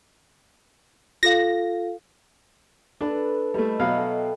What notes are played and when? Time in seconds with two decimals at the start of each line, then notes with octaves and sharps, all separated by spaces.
1.23 F4 A4 F5 A#6
3.01 D4 A4 B4
3.54 G3 A3 E4 D#5 E5
3.80 B2 F#3 F5
3.98 A4 G5